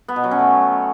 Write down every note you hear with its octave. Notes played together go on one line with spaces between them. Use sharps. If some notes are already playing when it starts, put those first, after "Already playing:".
B3
B2
F#3
C#4
A3